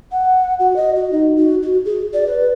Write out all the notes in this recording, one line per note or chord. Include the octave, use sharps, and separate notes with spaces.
F#5
F#4
D#5
F#4
D#4
F#4
F#4
G#4
D5
B4